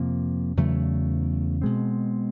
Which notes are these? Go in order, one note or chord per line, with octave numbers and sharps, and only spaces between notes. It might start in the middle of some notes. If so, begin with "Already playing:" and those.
Already playing: F2 C3 F3 A#3
E2 C#3 F#3 A3
B2 G#3 C4